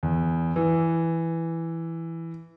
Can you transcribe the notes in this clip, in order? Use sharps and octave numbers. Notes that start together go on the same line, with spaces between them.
E2
E3